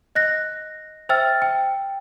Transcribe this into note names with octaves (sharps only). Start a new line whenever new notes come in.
D#5 F#6 A#6
C5 E5 G5 E6 F6 A6
G5